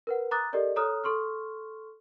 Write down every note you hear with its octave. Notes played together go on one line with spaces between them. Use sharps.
A#4 B4 F#5
A#5 D6 D#6 F#6 A6
G4 A4 A#4 D5 D#5
A4 C#5 A#5 D#6 F6 F#6
A4 C6 C#6 F6